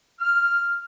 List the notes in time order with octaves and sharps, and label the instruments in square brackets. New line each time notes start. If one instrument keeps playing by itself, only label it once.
[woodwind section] F6